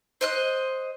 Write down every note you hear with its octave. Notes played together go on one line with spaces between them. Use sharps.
C5 D#5 F#6